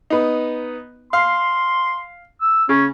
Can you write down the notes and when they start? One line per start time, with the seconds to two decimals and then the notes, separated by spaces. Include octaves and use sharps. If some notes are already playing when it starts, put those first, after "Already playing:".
0.10 B3 D#4
1.13 F5 C6
2.41 E6
2.69 C#3 C#4